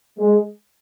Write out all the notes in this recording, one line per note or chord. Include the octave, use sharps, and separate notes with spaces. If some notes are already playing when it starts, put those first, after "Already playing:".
G#3